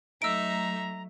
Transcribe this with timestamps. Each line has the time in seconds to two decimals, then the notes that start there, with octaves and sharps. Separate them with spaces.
0.22 F#3 A3 D#4 E5 A#5 E6 D7